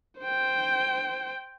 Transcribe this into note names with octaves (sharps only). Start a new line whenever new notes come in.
C5 G5